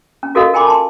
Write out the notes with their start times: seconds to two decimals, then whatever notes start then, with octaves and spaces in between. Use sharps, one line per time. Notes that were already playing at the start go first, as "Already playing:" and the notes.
0.23 C#4
0.35 F4 F#4 A4 A#4 D#5 F5
0.54 A#4 G5 G#5 B5 C6 D6
0.67 A5 C6